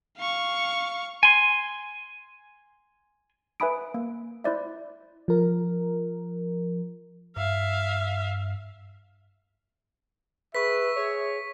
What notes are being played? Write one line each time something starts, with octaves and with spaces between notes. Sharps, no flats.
F5 C#6
G#5 C6
B4 E5 G#5 B5 D#6 D7
A#3
E4 C5 D5 E5
F3 A#4
G2 E5 F5
G#4 B4 E5 C#6 B6
G#4 C#5